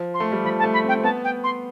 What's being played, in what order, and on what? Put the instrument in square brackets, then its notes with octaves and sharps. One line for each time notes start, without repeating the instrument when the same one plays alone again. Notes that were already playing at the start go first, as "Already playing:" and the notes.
Already playing: [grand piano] F3
[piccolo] C6
[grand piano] A3
G3
[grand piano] F3 [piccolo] B5
[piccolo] A5
[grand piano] A3
[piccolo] B5
[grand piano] C4
[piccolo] G5
[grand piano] C4
[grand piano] B3 [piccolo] A5
[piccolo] G5
C6